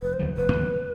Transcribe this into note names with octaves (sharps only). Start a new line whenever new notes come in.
F1 B4
C5
D#2 D3 F#3
F1 B4
D#2 D3 F#3